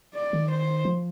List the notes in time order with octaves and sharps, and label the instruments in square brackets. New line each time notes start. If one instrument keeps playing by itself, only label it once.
[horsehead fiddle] D5
[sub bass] D#3
[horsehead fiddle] C5
[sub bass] F3